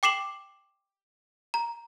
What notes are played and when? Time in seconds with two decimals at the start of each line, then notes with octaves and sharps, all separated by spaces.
0.03 G5 D6 C7 E7 F#7
1.54 A#5